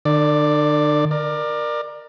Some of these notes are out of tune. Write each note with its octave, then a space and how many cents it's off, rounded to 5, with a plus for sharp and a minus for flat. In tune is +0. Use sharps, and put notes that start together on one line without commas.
D3 +45 D5 +5
A#4 +10 D5 +25